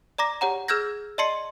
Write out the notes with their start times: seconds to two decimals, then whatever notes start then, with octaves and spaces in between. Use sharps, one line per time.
0.18 D5 A#5 D6 A#6
0.41 G4 C#5 F#5 A#5
0.68 G#4 E6 F6 G6 G#6 A#6
1.18 D5 D#5 A5 C6 C7 C#7